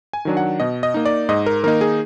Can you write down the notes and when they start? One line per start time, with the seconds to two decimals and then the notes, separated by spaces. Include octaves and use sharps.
0.13 G#5
0.25 D#3 F#3 D4
0.37 F#5
0.60 B2 D#5
0.83 D#5
0.94 A#3 D#4
1.06 D5
1.29 G#2 D#5
1.46 A#4
1.63 D#3 A#3 D#4 A#4
1.81 G#4